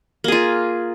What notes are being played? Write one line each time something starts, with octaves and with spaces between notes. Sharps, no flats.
A#3 F4 G#4